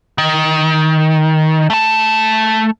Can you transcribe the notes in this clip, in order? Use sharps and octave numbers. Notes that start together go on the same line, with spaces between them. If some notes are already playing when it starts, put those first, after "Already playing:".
D#3
A3 A5